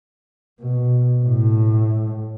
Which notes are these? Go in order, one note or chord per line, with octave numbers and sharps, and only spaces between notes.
B2
A2